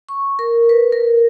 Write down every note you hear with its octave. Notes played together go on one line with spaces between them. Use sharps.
C#6
A#4
B4
A#4